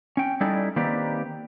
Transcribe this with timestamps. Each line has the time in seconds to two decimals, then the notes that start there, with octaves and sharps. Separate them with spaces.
0.17 C#4 G5
0.41 G3 C#4 D#4 E4 A4 D5
0.76 D#3 A#3 C4 G4 B4 D5